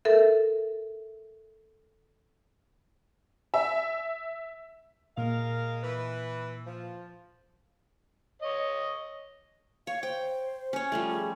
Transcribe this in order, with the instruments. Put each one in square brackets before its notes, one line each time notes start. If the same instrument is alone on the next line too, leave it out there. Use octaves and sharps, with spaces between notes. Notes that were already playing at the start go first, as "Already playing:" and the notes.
[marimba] A4 A#4 E5
[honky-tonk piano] E5
[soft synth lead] A#2 [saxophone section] G#3 A#4 F5
[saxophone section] E3 B4
F3
[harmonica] C#5 D#5
[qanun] C#5 [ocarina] F5
[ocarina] C5 [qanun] G5
[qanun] C#4 C#5
F3 G3 A3
[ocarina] G#4